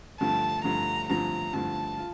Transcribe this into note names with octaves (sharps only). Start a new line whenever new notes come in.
G2 D3 F3 A3 A5
G2 D3 F3 A3 A#5
G2 D3 F3 A3 A#5
G2 D3 F3 A3 A5
F4